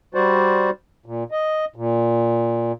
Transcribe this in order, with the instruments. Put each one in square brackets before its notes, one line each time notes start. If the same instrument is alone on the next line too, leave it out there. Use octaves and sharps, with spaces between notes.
[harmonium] G3 F#4 C5 D5
A#2
D#5
A#2